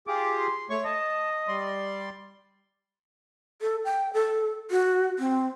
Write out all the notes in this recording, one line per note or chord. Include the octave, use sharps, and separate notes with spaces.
F4 G4 G#4 D6
C6
A3 C#5 C#6
D#5 A5
G3 D5 C6
A4
G5
A4
F#4
C4